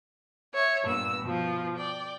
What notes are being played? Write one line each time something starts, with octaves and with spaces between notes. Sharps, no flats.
C#5 E5
G2 A#2 B3 E6
B2 F3 F4
D5 G5